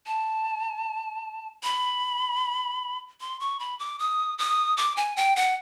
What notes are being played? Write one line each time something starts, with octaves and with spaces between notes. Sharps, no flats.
A5
B5
C6
C#6
B5
D6
D#6
D#6
D6
G#5
G5
F#5